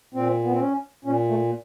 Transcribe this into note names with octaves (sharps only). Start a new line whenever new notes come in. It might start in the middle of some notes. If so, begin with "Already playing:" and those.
A#2 C4
B3
C4
C#4
A#2 C#4
A3